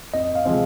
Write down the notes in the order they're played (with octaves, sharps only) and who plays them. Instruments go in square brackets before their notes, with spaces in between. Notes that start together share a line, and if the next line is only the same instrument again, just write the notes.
[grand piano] F2 [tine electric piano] D#5
[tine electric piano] F5
[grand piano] C3 F3 G#3 C4